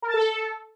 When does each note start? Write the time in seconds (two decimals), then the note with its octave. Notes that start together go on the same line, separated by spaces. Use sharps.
0.02 A#4
0.08 A5
0.14 A4